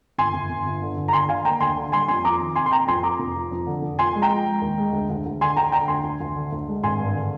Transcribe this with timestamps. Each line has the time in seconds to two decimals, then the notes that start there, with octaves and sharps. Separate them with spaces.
0.18 G1 G#5 C6
0.34 G1
0.50 G1
0.66 G1
0.82 D3
0.97 G1
1.08 A#5
1.13 D3 G#5 C6
1.29 D3 F5 G#5
1.45 A#3 G5 A#5
1.60 D2 G#5 C6
1.77 D3
1.92 G3 G#5 C6
2.08 F2 G#5 C6
2.24 F2 A#5 D6
2.40 D#3
2.55 C3 G#5 C6
2.66 C6
2.71 C3 G5 A#5
2.87 F2 G#5 C6
3.03 F3 A#5 D6
3.19 F1
3.36 F3
3.51 F2
3.67 D3
3.82 F1
3.99 F3 G#5 C6
4.15 G#3
4.22 G5 A#5
4.30 F3
4.46 G#3
4.61 D#2
4.78 G#3
4.93 D2
5.10 D2
5.26 D2
5.41 D3 G#5 C6
5.56 D2 G5 A#5
5.72 D3 G5 A#5
5.88 D2 G#5 C6
6.04 D2
6.20 D2
6.36 D3
6.52 D2
6.68 G#3
6.83 G#1 G#5 C6
7.00 G2
7.15 D3